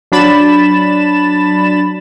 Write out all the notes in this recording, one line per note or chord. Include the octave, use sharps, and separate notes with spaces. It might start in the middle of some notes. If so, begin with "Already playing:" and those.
F#3 D4 B5 A6 E7